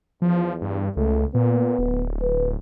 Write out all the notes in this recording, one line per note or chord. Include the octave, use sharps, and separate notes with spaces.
E2 F3
G2
C#2 A3
A#2 B3
D1
B4